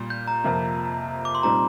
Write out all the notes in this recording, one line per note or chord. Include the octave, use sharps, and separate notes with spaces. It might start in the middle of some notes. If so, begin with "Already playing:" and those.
Already playing: A#2 G3
G6
A#5
F2 C3 F3 A#3
D6
C6
A#2 G3 C4 D#4 A#5